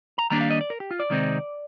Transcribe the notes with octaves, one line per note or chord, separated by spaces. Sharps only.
A#5
D#3 G3 A#3 D4 A#5
F5
D#5
D5
A#4
G4
F4
D5
C3 D#3 G#3 C4 D#4